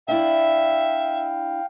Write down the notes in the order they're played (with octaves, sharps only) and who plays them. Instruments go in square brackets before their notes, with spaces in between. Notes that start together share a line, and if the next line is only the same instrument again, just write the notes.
[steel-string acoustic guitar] D4 E4 [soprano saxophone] E5 [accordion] F5 G5